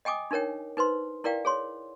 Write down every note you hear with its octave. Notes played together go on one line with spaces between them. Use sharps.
D#5 G5 G#5 D6 D#6
D4 D#4 A#4 C#5 G5
D#4 B4 C5 C6
E4 A#4 D5 F5 G5
G#4 C#5 C6